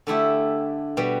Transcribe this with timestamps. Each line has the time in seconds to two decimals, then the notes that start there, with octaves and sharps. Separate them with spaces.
0.07 D3 A3 E4 G4
0.97 B2 G3